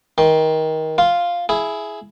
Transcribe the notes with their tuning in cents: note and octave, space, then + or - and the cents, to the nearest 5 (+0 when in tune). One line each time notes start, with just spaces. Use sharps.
D#3 +25 C6 +0
F4 +0 C6 +0
E4 +5 G#4 +15